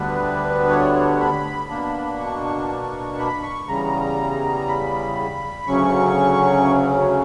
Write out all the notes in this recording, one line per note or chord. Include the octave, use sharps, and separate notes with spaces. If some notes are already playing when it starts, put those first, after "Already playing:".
Already playing: D2 D3 G3 B3 D4 B4
C#5
C#5
B5
B2 A#3 D4
C#6
B5
C#6
E2 C#3 G3 A#5
B5
D2 C#3 F#3 C#4 C#6